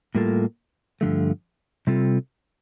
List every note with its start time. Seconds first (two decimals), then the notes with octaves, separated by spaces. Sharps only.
0.15 A2 G3 A#3 F4 A4
1.01 G2 D3 F3 A3
1.87 C3 G3 C4 F4 A4